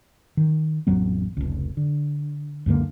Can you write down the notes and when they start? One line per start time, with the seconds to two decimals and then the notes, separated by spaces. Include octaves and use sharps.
0.37 D#3
0.87 A1 F2 F#3 B3
1.37 F1 C#2
1.77 D3
2.66 C#2 F#2 D3 A#3